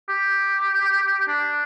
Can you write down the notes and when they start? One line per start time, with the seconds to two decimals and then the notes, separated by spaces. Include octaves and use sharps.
0.09 G4
1.28 D4